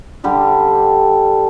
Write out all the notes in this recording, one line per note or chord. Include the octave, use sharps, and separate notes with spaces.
D3 G3 G4 D6